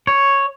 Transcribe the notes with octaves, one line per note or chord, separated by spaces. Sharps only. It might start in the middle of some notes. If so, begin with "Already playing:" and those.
C#5